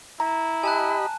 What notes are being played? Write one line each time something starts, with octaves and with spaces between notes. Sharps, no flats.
E4 A#5
G4 D#5 G#5 A5 B5 F#6